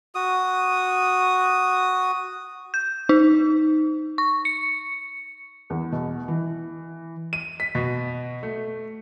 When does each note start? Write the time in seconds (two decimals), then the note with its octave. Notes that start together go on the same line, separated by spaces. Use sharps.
0.15 F#4 D#6
2.74 G6
3.09 D#4
4.18 C#6
4.45 C#7
5.70 E2
5.92 B2
6.28 E3
7.33 D#7
7.60 B6
7.75 B2
8.43 A3